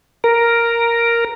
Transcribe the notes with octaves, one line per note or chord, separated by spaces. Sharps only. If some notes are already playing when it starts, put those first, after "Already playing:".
A#4